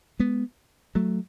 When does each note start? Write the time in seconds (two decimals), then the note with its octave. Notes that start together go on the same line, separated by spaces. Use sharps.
0.19 G#3 B3
0.95 F#3 A3